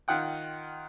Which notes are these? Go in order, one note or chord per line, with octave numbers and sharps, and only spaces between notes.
D#3 F4 F#5 G5